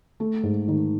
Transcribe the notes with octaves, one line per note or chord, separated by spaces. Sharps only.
A3
G#2
D#3